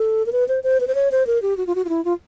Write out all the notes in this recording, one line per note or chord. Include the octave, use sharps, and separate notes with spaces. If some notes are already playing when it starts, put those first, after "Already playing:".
Already playing: A4
A#4
B4
C5
C5
B4
C5
C#5
C5
A#4
G4
F#4
F4
F#4
F4
E4
F4